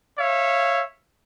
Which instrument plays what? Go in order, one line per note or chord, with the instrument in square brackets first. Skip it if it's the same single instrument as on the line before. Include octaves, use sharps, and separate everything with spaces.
[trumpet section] C#5 E5 F5